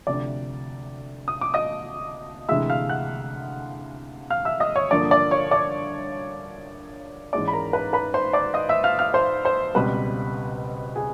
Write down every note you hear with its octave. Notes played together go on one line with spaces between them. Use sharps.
D2 C3 F3 D5 D6
D#6
D6
D#5 D#6
D2 C3 E3 G#3 E5 E6
F5 F6
F#5 F#6
F5 F6
E5 E6
D#5 D#6
C#5 C#6
G2 D3 F3 A#3 D5 D6
D5 D6
C#5 C#6
D5 D6
G#2 E3 G#3 C#4 D5 D6
B5
A#4 A#5
B4 B5
B4 B5
C5 C6
D5 D6
D#5 D#6
E5 E6
F5 F6
F5 F6
C5 C6
C5 C6
C#2 B2 G3 C4 B4 B5
G#4 G#5